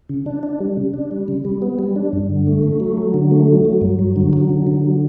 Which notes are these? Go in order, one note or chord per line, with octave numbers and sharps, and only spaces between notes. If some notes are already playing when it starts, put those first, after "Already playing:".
C#3
D4
D4
G3
C#3
D4
G3
C#3
G3
B3
G3
D4
G2
D3
A3
A3
F#3
F#3
D3
A3
F#3
F#3
G2
F#3
D3
F#3
D3
D3
F#3